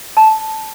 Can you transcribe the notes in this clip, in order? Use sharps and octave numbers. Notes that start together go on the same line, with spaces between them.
A5